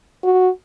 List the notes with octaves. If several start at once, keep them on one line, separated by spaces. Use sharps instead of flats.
F#4